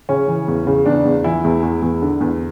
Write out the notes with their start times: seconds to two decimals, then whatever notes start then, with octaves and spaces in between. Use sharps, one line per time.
0.09 C#3 C#4
0.28 E3
0.48 E2
0.67 C#3
0.86 E2 D4
1.05 E2
1.24 E3 E4
1.44 E2
1.63 E2
1.82 E2
2.02 D3
2.21 E2